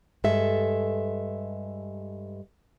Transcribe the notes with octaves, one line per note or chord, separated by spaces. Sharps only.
G2 G#3 A4 E5